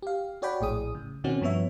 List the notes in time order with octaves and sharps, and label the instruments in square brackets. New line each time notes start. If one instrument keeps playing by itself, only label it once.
[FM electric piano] G4 F5
F#4 C#5 D5 F#5 G5 B5
A#1 A2 G#4 D#6
C#3
B2 D#3 C4 C#4 F#4
G2 F3 B3 C#5 E5